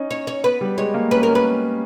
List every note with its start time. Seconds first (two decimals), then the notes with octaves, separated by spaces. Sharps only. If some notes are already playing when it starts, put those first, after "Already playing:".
Already playing: C#4 D#4
0.11 C#5
0.27 C#5
0.44 B3 B4
0.61 G3
0.78 G#3 C#5
0.94 A#3
1.11 C#4 B4
1.20 B3 A#4
1.29 C#4
1.35 B4